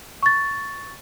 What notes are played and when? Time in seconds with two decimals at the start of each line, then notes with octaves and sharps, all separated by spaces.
0.23 C#6 A6